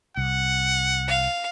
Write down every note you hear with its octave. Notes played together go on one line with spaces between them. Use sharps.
C2 F#5
F5